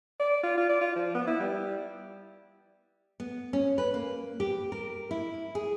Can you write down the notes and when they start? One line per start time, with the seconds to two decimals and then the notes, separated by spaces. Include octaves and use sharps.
0.20 D5
0.43 F4
0.57 F4
0.69 D5
0.81 F4
0.96 F3
1.15 B3
1.27 E4
1.40 G3
3.20 B3
3.53 C#4
3.78 B4
3.94 A#3
4.40 G4
4.72 A#4
5.11 E4
5.55 G#4